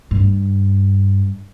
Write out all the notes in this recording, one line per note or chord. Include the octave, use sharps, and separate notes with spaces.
G2